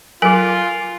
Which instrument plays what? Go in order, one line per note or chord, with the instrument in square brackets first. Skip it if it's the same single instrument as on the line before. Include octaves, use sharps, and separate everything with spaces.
[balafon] F#3 A#4 [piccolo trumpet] F4 [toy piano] G#4 G#5